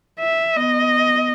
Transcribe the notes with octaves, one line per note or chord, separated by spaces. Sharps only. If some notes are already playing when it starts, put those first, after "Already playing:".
E5
B3 D#5